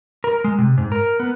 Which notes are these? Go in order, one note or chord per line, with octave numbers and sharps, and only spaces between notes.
A#4
G#3
C3
G#2
A#4
B3